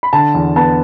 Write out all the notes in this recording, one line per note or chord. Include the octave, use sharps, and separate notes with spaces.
B5
D3 A5
E2
B3 A5